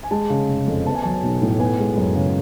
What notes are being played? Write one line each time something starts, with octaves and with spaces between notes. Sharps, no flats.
G#5
G#3 A5
C#3
F1
F2
B3 A5
G#5
F#3 A5
B1
A2
B3 G#5
G#3
F#2
C#3